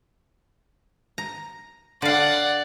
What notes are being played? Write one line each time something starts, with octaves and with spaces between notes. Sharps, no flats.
A#5
D3 D5 F5 F#5